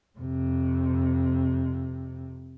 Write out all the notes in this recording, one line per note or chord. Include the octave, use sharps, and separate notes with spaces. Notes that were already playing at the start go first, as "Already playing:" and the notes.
F2 C3